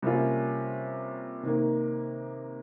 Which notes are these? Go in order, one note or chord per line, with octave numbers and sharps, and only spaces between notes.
C3 G3 A#3 C#4 F4
C3 D#3 A#3